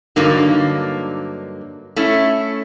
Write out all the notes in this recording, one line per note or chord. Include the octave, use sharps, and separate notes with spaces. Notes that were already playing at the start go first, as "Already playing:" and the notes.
G2 D3 F#3 A#3 D#4
A3 C#4 E4